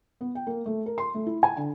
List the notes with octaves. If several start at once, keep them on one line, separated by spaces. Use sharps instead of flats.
B3
G5
A#3
A3
A#4
C6
A3
E4
G#5
D3